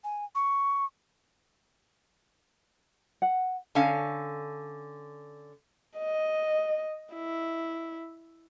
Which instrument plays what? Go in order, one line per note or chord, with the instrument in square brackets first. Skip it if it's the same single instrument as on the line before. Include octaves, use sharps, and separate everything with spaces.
[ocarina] G#5
C#6
[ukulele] F#5
[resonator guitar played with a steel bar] D3 C#4 F5
[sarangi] D#5
E4